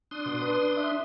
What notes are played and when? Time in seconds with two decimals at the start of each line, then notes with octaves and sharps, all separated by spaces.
0.11 D4 C6 D#6
0.26 B2
0.42 B4
0.77 E5